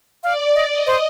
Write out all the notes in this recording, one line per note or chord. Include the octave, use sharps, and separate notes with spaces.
D5 F5
D#5
D#5
C5